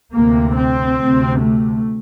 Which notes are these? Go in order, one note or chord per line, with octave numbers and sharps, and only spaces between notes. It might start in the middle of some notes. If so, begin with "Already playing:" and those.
D2 C3 A#3
C4
D2 C3
A3